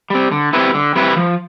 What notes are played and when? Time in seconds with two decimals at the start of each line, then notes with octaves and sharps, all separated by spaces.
0.10 G3 C4
0.31 D3
0.53 G3 C4 E4 B4
0.74 D3
0.96 G3 C4 E4 B4
1.17 F3